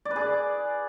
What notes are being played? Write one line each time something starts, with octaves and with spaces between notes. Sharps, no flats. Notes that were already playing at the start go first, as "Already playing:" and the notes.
D5
B4
G#4
D5